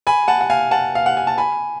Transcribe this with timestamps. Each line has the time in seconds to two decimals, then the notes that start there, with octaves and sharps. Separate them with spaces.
0.07 G#5 B5
0.28 F#5 A5
0.41 F#5
0.50 F5 G#5
0.71 F#5 A5
0.95 F5
1.06 F#5
1.17 G#5
1.27 A5
1.38 G#5 B5